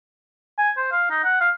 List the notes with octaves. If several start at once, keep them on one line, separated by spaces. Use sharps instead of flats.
G#5
C5
F5
D#4
F#5
F5